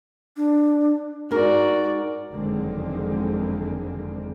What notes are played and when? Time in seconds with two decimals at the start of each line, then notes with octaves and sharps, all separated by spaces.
0.37 D4
1.31 G#2 F#4 A#4 D5
2.31 F#1 F2 D3 D#3 G#3 C4